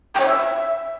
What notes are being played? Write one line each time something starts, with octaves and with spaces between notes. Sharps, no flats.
G5
C#5
E5